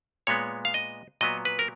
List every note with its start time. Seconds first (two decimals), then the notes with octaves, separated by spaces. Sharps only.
0.27 A#2 G#3 B3 C#5
0.65 F5
0.74 D#5
1.21 A#2 F#3 B3 D#5
1.45 B4
1.59 A#4